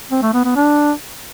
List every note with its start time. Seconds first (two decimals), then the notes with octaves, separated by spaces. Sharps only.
0.11 C4
0.22 A3
0.34 B3
0.45 B3
0.56 D4